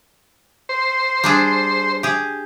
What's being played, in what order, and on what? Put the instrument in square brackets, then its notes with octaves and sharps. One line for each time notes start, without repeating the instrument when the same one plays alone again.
[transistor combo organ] C5
[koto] G3 D4 G#4
G4 G#4